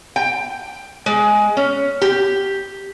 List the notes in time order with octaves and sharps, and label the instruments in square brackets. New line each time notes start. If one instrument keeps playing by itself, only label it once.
[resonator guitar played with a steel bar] G5
G#3
C#4
G4